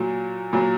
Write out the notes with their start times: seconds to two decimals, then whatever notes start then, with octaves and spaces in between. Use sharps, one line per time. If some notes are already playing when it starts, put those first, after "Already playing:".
Already playing: A#2 F#3
0.53 A#2 F#3